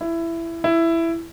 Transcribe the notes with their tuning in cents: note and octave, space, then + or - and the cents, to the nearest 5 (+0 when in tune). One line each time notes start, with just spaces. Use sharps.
E4 +15
E4 +10